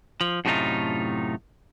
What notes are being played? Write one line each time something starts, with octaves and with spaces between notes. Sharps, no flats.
F3
F#2 A2 C3 A3 D#4 F4